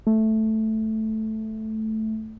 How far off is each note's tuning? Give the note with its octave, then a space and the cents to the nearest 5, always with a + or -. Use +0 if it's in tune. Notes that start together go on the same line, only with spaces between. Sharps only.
A3 -5